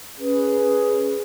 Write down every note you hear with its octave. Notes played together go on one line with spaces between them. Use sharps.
C#4 G#4 B4